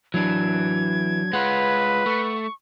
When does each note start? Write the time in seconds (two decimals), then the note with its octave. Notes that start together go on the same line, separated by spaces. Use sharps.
0.14 E3 F#3 D4 G#6
1.33 G#3 F4 B4 F#5
2.06 A3 C#6